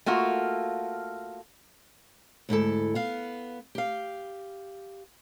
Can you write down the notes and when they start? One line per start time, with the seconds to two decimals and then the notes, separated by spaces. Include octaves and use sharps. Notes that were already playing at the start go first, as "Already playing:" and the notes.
0.06 A3 A#3 F4 F#4
2.49 D2 G#2 E4 A4
2.95 B3 F5
3.75 G4 F5